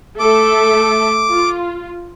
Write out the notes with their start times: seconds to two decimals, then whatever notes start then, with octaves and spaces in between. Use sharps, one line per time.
0.19 A3 A4 E5 D6
1.29 F4